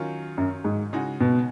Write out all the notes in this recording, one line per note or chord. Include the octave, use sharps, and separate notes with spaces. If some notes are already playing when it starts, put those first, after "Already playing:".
Already playing: D#3 F#3 C#4 F4
F#2
G#2
C#3 G#3 D#4 F#4
B2